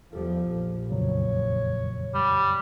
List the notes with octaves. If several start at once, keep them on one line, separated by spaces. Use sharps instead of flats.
E2 F3 G4 A4
A#1
F2 C#3 F#3 C#5
G3